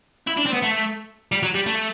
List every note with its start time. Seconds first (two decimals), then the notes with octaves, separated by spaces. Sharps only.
0.27 E4
0.37 D4
0.46 C4
0.53 B3
0.62 A3
1.32 G3
1.43 F#3
1.54 G3
1.66 A3